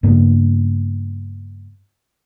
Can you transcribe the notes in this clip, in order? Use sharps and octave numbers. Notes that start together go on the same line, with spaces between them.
G2 C#3 A#3 B3